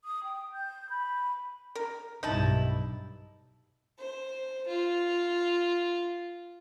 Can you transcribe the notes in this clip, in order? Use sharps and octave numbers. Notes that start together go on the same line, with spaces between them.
D#6
G5
G6
B5
A#4
B1 G2 D#4 E4 A5
C5
F4